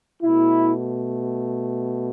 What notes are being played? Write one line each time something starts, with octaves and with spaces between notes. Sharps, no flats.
B2 A3 E4